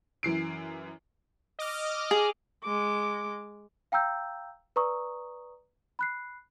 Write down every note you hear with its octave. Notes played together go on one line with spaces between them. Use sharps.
F#2 E3 C7 D7
D#5 D6 F6
G#4
G#3 D6
F5 G5 A#5 E6 G6
B4 D5 A#5 C#6 D#6
B5 F#6 C7